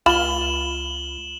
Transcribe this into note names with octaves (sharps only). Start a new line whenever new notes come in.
C#2 F4 B5 E7 F#7 G7